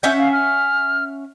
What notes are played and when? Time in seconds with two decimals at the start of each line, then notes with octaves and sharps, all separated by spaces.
0.03 C#4 E5 F#5 G6
0.19 F5
0.32 F6